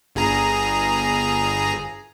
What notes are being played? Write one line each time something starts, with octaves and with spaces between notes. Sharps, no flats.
G1 G#4 A#5